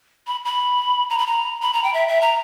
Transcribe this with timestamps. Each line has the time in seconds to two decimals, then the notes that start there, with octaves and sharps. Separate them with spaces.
0.27 B5
0.45 B5
1.10 A#5
1.18 B5
1.26 A#5
1.62 B5
1.74 A#5
1.84 G5
1.94 E5
2.08 E5
2.21 A#5